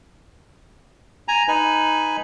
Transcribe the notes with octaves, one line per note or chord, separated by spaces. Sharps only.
G#5 A#5
D#4 B4 G#5